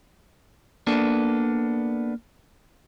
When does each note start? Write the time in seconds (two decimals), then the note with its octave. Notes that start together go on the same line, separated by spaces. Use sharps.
0.87 A#3 B3 D4 A4